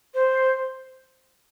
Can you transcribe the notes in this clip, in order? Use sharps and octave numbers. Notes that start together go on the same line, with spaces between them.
C5